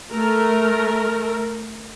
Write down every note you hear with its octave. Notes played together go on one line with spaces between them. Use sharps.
A3 A#4